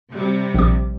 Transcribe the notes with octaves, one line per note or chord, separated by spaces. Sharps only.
C3 G3
A#1 D6